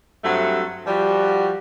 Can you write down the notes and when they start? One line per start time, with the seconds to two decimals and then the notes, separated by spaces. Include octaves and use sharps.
0.24 G2 F#3 A3 C4 E5 F#5
0.86 F3 G3 F#4